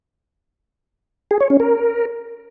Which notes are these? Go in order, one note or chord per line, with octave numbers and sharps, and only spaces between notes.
G#4
C#5
C#4
A#4